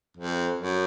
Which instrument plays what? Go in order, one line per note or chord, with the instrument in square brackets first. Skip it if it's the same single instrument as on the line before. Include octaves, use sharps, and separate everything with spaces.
[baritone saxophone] F2
F#2